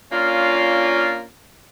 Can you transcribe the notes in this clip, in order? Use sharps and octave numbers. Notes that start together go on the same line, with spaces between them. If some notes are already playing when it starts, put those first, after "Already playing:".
A#3 C#4 D4 F4